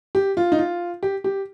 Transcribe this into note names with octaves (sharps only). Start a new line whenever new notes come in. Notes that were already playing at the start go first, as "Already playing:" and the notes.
G4
F4
D#4
F4
G4
G4